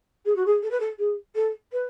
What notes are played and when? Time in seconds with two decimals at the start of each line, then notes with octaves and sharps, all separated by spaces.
0.25 G#4
0.35 F#4
0.46 G#4
0.62 A4
0.70 B4
0.80 A4
0.98 G#4
1.35 A4
1.72 B4